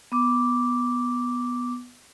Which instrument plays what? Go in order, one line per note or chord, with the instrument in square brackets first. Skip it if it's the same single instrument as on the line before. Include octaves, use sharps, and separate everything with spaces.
[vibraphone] B3 D6